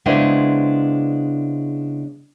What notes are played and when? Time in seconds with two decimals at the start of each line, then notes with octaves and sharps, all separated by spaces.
0.06 C#3 G#3 B3 D4 E4 C5